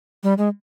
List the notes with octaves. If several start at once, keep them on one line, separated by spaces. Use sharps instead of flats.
G3
G#3